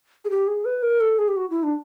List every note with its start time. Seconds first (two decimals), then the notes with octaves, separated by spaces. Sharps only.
0.25 G#4
0.30 G4
0.47 G#4
0.65 B4
0.83 A#4
1.01 A4
1.19 G#4
1.28 G4
1.37 F#4
1.50 E4
1.63 D4